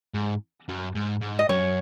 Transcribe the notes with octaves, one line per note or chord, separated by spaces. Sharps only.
G#2
F#2
G#2
G#2
D#5
F#2 C#5